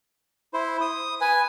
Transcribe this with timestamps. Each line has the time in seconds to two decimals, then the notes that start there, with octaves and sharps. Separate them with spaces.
0.54 E4 C5
0.81 D#6
1.21 B4 G#5